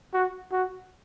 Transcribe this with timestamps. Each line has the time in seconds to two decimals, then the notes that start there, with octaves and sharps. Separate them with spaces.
0.14 F#4
0.52 F#4